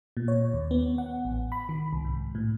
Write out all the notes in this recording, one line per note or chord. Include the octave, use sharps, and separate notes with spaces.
A#2
C#5
D#2
B3
F#5
A1
B5
D#3
C2
G#2
A2